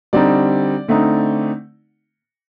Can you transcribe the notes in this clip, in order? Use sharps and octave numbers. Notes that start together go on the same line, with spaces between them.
D3 G3 C4 D#4 D5
D3 A3 C4 D#4